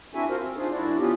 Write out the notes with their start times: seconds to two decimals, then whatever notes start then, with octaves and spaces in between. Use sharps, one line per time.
0.15 C4 D4 E4 F#4 E5 G#5
0.29 F4 F#4 A#4 C5
0.41 C4
0.57 D4 D#4 F4 G#4 C5
0.72 F#2 D4 E4 F#4 D5
0.98 E3 B3 C#4 F4 G4